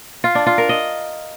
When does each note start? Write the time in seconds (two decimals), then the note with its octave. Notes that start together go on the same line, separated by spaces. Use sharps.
0.24 F4
0.35 D4
0.47 F4
0.58 A#4
0.69 D#5